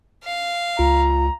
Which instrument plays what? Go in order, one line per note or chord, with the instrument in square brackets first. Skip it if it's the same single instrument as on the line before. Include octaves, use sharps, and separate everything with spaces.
[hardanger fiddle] F5
[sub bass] C#2 [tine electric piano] F4 [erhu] A#5